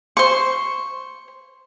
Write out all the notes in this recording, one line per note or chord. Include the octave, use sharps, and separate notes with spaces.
C5 C#6